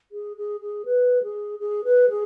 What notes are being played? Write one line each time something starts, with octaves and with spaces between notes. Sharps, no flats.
G#4
G#4
G#4
B4
G#4
G#4
B4
G#4